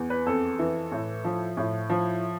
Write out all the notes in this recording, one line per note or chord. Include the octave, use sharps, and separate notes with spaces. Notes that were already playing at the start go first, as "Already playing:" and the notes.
Already playing: E2
B4
F2 A4
E3
A2
F3
A2
F3